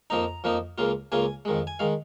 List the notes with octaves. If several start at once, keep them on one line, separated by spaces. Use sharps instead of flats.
F2 F3 A#3 D#4 A#5
F2 F3 A#3 D#4
C#2 C#3 A#3 F4
C#2 C#3 A#3 F4 G#5
F2 D#3 G#3
G#5
D#3 G#3 F5